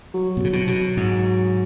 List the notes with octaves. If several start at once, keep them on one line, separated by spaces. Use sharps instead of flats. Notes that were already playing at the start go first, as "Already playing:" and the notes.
F#3
B2
C#3
B2
B2
G#2